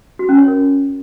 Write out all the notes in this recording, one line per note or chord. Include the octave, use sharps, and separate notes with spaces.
F#4
C#4
C#5
A#4